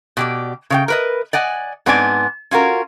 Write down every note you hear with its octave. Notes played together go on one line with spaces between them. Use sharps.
B2 G4 D5
C#3 D5 G5
A#4 B4 D#5
D5 D#5 F#5 G#5
G#2 B3 C4 D4 D5 G#5
C#4 F4 F#4 A#4